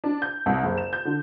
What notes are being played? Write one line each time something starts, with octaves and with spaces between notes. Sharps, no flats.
D4
G6
C2
F#1
E7
G6
D3